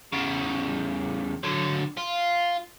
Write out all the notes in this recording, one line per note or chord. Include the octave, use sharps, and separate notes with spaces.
E2 C#3
D3 F#3
F4